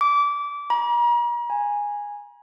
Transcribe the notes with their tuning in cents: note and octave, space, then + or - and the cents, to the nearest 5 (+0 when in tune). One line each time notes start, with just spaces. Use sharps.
D6 -25
A#5 +40
G#5 -10